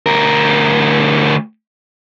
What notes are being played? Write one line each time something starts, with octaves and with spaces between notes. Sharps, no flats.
D2 A#4